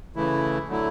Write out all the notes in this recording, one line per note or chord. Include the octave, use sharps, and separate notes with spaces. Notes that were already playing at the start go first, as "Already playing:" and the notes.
C#3 E3 A3 E4
D3 F#3 A3 E4